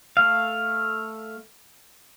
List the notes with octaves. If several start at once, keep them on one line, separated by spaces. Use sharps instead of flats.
A3 F5